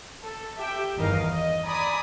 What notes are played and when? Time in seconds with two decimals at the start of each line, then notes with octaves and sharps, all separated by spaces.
0.24 A4
0.59 G4 E5 G5
0.96 G1 E2 D#3 A#4 D#5 F5
1.32 D#5
1.65 D5 G#5 A#5 B5 D#6